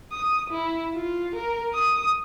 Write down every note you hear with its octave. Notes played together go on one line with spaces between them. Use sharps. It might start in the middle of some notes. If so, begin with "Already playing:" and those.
D#6
E4
F4
A#4
D#6